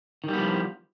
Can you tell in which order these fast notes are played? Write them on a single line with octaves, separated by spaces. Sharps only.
D#3 G3 B3 F3